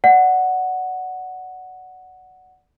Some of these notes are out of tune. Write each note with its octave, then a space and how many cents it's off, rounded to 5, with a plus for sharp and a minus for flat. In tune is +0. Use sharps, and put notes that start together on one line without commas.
D5 +0 F#5 +0